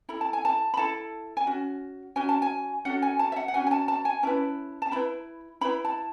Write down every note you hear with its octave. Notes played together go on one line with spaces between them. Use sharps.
E4 A4 B5
A5
G#5
A5
B5
E4 A4 A5
G#5
C#4 F#4
C#4 F#4 G#5
A5
G#5
C#4 F#4 A4 F#5
G#5
A5
E5
F#5
F#5
C#4 F#4 G#5
G#5
A5
A5
G#5
C#4 E4 B4 A5
A5
C#4 E4 B4 B5
C#4 E4 B4 B5
A5